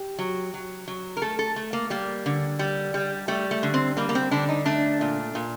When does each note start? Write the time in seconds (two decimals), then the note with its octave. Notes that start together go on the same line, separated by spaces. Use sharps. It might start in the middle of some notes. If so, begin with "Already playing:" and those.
Already playing: G4
0.19 F#3
0.54 F#3
0.88 F#3
1.17 A#4
1.22 A3 A4
1.39 A4
1.56 A3
1.73 A#3
1.90 G3 A#3
2.26 D3
2.59 G3
2.94 G3
3.28 G3 A3
3.51 A3
3.63 D3
3.74 C4
3.97 G3 A#3
4.09 A#3
4.15 C4
4.31 D3 D4
4.49 D#4
4.66 A3 D4
5.01 A#2
5.35 A#2